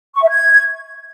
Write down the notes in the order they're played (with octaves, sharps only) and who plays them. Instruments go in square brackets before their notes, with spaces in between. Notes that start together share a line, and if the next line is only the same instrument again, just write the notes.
[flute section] C#6
E5
G#6